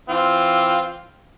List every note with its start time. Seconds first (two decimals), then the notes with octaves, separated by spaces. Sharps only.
0.09 E3 C4 F4